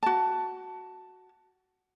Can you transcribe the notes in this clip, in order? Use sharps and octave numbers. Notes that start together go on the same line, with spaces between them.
F#4 A5